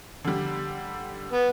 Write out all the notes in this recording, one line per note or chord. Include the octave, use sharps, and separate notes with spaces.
D3 G3
B3